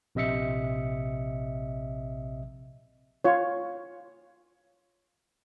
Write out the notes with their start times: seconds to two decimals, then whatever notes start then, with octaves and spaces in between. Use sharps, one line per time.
0.15 A#1 C3 D#5 E5 C#7
3.24 F4 C#5